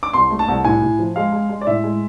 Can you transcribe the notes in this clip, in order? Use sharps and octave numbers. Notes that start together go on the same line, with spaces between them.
D6
C2 C6
A3
A5
C2
A2 G#5
A2
F3
G#3 F5
G#3
G#3
D5
A2 E5
G#3